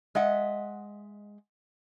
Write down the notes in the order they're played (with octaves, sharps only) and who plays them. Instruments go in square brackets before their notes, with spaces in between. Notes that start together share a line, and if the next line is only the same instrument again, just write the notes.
[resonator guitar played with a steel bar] G#3 D#5 E5 F#5